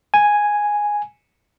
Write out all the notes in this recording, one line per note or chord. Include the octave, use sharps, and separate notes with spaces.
G#5